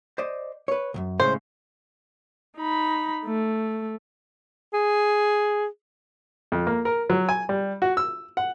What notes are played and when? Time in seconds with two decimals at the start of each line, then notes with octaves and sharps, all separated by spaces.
0.18 C5 D5 D#5
0.68 B4 C#5
0.94 C2 F#2
1.20 A2 C#3 G#3 C5
2.57 D#4 B5
3.25 A3
4.73 G#4
6.52 F2
6.67 A#3
6.85 A#4
7.10 F#3
7.29 G#5
7.49 G3
7.82 F#4
7.97 E6
8.37 F#5